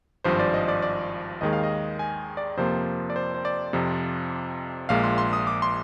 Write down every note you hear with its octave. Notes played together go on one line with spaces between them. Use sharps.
G#1 G2 F3 C5
D5
D#5
D5
D5
D#2 D#3 G#3 D#5
F5
D#5
G#5
D5
F2 C3 F3 A#3 C5
D5
C5
C5
D5
F2 C3 F3
A#1 A#2 G#3 F5
C6
C6
D#6
D6
C6